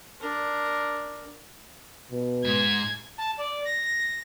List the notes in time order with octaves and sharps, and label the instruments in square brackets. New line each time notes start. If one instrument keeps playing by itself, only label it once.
[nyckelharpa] D4 A#4
[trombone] B2
[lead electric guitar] G#2 [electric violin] G#6
[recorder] A5
D5
A#6